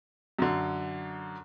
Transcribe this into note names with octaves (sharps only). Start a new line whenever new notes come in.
F#2 D3